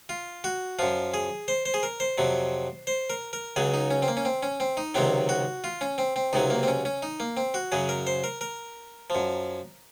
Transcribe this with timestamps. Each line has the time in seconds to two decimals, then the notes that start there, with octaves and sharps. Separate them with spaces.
0.09 F4
0.44 F#4
0.79 F#2 F3 F4
1.14 G#4
1.48 C5
1.66 C5
1.74 G#4
1.83 A#4
2.00 C5
2.18 F2 C3 F#3
2.87 C5
3.10 A#4
3.33 A#4
3.56 C#2 C#3 F#3 G#4
3.74 D#4
3.91 C#4
4.02 C4
4.08 A#3
4.17 C#4
4.25 C4
4.43 C#4
4.60 C4
4.77 D#4
4.95 C#2 C3 D#3 F#3 C4
5.29 F#4
5.64 F4
5.81 C#4
5.98 C4
6.16 C4
6.33 C#2 C3 F#3 D#4
6.50 A#3
6.63 C4
6.68 C#4
6.85 C#4
7.02 D#4
7.20 A#3
7.37 C4
7.54 F#4
7.72 F#2 C#3 F#3 G#4
7.89 A#4
8.07 C5
8.24 A#4
8.41 A#4
9.10 F#2 F3